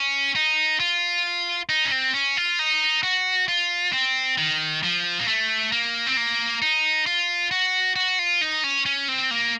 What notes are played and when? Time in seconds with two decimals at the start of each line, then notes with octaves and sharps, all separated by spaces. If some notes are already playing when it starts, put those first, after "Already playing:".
Already playing: C#4
0.36 D#4
0.80 F4
1.69 D#4
1.85 C#4
1.92 C4
2.13 C#4
2.37 F4
2.59 D#4
3.03 F#4
3.48 F4
3.93 C4
4.38 D#3
4.83 F3
5.20 A#3
5.28 A3
5.72 A#3
6.07 C4
6.17 A#3
6.62 D#4
7.06 F4
7.51 F#4
7.96 F#4
8.19 F4
8.41 D#4
8.64 C#4
8.86 C#4
9.08 C4
9.31 A#3